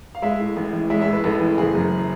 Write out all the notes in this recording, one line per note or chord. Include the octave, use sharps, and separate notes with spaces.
F5
G#3 E5
A2
A1
E3
G#3 E5
E5
A2
B4
A1 A4
E3
F#1 G#4
F#2